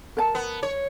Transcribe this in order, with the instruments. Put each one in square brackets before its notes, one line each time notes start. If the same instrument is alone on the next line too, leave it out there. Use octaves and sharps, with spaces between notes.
[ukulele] A#4 A5
[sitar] B3
C#5